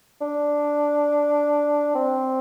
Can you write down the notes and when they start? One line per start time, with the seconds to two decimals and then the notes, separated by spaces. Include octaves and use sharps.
0.21 D4
1.95 C4